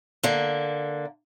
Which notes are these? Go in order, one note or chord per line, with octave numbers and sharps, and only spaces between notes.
D3 A#3